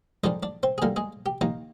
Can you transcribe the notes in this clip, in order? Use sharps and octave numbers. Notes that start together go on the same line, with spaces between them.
F2 D#3 G#3 D4 D#4 D#5
D4 D5
C4 C5
G#4
D2 D3 G3 A#3 A#4
G#3 G#4
G4
D#2 D#3 A#3 D#4